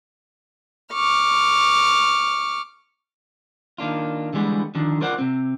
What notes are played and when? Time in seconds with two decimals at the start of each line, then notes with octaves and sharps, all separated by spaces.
0.93 C#6 D6 F6
3.78 D#3 A#3 D4 F4
4.33 D3 E3 G3 G#3 B3
4.75 D3 D#3 F3 D4
5.01 F4 A#4 C5 D5 F#5
5.19 C3 C4